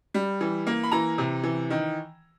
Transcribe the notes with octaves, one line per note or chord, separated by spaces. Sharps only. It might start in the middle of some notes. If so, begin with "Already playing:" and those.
G3
E3
A#3
B5
E3 A#5
C3
E3
D#3